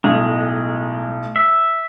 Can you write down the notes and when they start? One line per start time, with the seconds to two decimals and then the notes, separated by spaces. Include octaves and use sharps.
0.04 B1 A2 G#3
1.36 E5